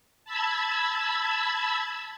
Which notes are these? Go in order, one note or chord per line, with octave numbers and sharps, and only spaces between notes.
A5 B5 E6 G#6